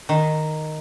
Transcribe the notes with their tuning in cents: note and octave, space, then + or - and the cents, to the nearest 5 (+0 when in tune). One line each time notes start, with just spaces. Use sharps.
D#3 -5